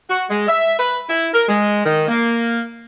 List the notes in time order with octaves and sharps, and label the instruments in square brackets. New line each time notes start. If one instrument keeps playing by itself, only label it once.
[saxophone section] F#4
G#3
E5
B4
E4
A#4
G#3
D#3
A#3